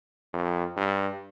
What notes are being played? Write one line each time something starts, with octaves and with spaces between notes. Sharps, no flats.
F2
G2